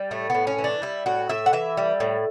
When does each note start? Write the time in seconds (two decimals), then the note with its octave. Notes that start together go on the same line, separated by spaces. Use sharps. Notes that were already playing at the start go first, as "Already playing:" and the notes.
Already playing: G3
0.11 A2 A3
0.30 A2 B3
0.47 C#4
0.58 E3
0.64 D4
0.82 G3 E4
1.06 A2 F#4
1.29 A2 E5
1.46 F#5
1.53 E3 E5
1.77 G3
2.00 A2